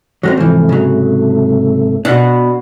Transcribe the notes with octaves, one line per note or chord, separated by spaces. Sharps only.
F#3 G#3 C4 C#4 A#5
G#2 C3 E3 F3 A3
C#3 F#3
B2 D4 F#4